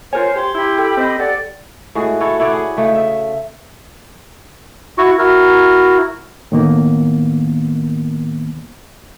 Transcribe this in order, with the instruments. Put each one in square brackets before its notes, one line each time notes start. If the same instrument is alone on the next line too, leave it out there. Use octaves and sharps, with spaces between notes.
[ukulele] F4 A#4 G#5 [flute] C5 [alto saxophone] C#5
[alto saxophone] G4 [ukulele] C5 C#5 [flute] C6
[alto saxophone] E4 [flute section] G4 B5
[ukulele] A4 G5
[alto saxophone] C4 [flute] D#5
[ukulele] G4 [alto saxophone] A4 [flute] D5 [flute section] F#5
[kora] A2 G#3 F#4 G#4
E4 F#4 A4 C#5
E4 C#5 D5 F#5
G#4
C#3 A3 D#4
E5
[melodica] E4 F#4 C#6
E4 F#4 A#4
[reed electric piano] A2 D#3 A#3 B3